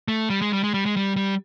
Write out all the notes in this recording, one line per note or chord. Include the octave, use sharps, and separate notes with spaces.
A3
G3
G#3
G3
G#3
G3
G#3
G3
G3